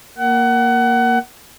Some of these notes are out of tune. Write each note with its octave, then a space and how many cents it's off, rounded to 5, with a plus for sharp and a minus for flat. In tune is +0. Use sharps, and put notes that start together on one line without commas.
A#3 +0 F#5 +25